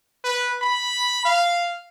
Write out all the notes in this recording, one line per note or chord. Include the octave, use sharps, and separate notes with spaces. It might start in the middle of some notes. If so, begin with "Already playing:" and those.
B4
B5
F5